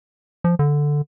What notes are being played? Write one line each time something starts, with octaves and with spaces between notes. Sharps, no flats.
F3
D3